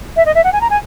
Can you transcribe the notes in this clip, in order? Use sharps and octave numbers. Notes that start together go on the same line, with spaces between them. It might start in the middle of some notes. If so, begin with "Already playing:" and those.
E5
D#5
E5
F#5
G#5
A#5
G#5